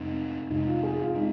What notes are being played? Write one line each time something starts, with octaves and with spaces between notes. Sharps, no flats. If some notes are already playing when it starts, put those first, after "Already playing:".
Already playing: F2 C3 G#3 C4 D#4
F2 C3 G#3 C4 D#4
F4
G#4
F4
G#3 C4 D#4